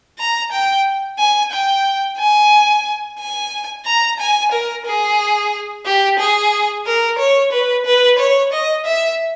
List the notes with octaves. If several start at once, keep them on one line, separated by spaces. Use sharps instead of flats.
A#5
G5
G#5
G5
G#5
G#5
A#5
G#5
A#4
G#4
G4
G#4
A#4
C#5
B4
B4
C#5
D#5
E5